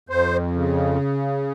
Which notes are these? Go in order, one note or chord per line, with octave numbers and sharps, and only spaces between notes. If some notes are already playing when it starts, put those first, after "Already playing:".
F2 C5
C#3